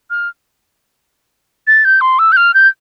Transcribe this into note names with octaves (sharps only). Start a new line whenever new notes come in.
F6
A6
G6
C6
E6
G6
F6
G6